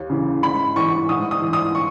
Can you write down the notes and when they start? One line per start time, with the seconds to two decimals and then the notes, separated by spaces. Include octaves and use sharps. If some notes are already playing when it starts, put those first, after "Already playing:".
Already playing: D#2
0.10 C#3 E3
0.43 G#2 B5
0.76 E3 C#6
1.09 G#2 D#6
1.31 D#6
1.42 E3
1.53 D#6
1.75 C#6